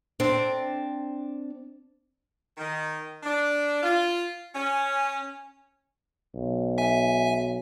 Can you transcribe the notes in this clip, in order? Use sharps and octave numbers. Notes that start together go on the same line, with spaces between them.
C4 D4
D#3
D4
F4
C#4
B1
E5 G#5